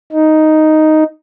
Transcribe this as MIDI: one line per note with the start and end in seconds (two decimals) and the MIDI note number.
0.12 1.04 63